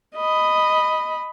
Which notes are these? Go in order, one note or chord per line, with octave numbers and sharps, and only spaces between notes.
D#5 B5